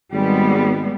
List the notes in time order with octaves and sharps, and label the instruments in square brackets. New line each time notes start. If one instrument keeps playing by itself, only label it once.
[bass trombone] G#1 [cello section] G3 G#3 B3